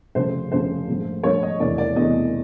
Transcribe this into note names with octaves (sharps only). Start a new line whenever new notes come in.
F1 F2 C#3 F3 C5
F1 F2 C#3 F3 C5
A#1 G#2 F3 A3
A#1 G#2 F3 A3 C#5
D#5
E1 E2 C3 E3 A3 D5
D5
E1 E2 C3 E3 A3 D#5